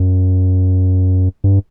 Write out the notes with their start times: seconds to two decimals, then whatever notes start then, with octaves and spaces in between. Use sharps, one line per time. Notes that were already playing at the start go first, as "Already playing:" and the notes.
Already playing: F#2
1.44 G2